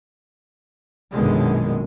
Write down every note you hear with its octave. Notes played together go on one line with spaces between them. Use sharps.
A#1 F#2 B2 D3 D#3 G#3